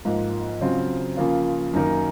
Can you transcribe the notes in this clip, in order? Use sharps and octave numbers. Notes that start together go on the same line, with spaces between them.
G#2 F3 A#3 F4
C#3 F#3 C4 F4
C#3 F3 A#3 F4
F#2 D#3 A#3 D#4 A#4